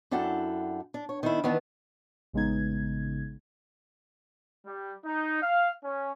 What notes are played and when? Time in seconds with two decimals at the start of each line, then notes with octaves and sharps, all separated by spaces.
0.11 F#2 D4 E4 A4 F#5 G5
0.94 D4
1.09 C#5
1.23 D#3 D4 E4
1.44 D#3 E3 B3 D4
2.33 A1 C#3 G#3 B3 D#4 G#6
4.64 G3
5.04 D#4
5.42 F5
5.83 C#4